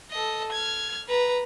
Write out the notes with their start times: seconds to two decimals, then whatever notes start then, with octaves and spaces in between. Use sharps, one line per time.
0.11 A4 D#5
0.52 F6 G#6
1.09 B4 A#5